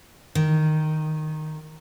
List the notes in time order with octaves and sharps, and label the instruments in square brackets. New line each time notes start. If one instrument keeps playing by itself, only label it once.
[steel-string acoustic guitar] D#3